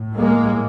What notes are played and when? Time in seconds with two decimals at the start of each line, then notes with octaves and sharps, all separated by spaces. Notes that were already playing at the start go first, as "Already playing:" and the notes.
Already playing: A2
0.16 G#3 A#3